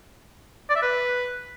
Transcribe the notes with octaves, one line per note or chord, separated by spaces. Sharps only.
D5
E5
B4